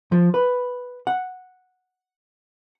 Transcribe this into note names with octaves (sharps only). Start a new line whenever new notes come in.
F3
B4
F#5